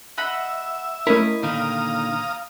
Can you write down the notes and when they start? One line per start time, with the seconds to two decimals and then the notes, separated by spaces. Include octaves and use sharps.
0.18 D#5 E5 F#5 B5
1.07 A3 C#4 E4 A#4 D#5 B5
1.43 A#2 D3 D#3 F5 A#5 D#6